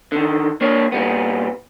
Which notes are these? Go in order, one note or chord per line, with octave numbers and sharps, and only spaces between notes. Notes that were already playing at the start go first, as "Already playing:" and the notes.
D3 D#3
A#3 D4 C#5
A#2 G3 B3